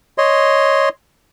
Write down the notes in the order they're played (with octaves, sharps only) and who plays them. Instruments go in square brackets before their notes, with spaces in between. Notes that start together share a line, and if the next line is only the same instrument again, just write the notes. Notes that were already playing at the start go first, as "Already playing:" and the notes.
[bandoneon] C#5 D#5 C6